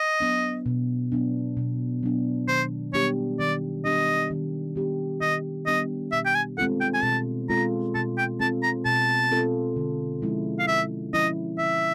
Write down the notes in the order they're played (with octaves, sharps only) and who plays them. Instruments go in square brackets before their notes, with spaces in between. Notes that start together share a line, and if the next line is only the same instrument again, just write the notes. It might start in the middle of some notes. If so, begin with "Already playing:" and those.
Already playing: [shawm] D#5
[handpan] F#3 B3 D4
B2
F#3 B3 D4
B2
F#3 B3 D4
[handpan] D#3 [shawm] C5
[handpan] G3 B3 D4 G4 [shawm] C#5
[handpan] D#3 [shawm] D5
[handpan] G3 B3 D4 G4 [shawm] D#5
[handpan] D#3
G3 B3 D4 G4
[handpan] D#3 [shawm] D#5
[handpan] G3 B3 D4 G4 [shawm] D#5
[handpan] B2 [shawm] E5
[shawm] G5
G#5
[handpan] G#3 C4 F4 A4 [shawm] F#5
[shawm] G5
G#5
[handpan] B2 [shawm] A5
[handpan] G#3 C4 F4 A4 [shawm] A#5
[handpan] B2 [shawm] A5
[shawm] G5
[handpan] G#3 C4 F4 A4 [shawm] A5
[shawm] A#5
[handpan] B2 [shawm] A5
[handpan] G#3 C4 F4 A4
D3
F3 G#3 C#4 E4
[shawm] F5
[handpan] D3 [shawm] E5
[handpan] F3 G#3 C#4 E4 [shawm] D#5
[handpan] D3 [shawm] E5